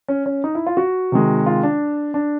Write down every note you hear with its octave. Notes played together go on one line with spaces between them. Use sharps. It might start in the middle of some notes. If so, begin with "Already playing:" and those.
C#4
C#4
D#4
E4
F4
F#4
C3 D#3 G#3
F4
D4
D4